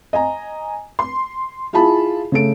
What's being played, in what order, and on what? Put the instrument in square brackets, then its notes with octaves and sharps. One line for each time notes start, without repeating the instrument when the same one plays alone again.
[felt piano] D#5 G#5 A#5
C6
E4 F4 G#4 A5 B5
C#3 A3 D7